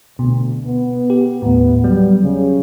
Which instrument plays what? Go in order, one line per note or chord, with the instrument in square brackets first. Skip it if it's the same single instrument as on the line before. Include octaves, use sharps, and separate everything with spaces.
[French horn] D2 [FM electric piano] B2
[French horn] B3
[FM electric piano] G4
[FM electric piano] D#2 A2 [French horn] B3
[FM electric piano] F#3 [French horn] G3
[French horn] C#3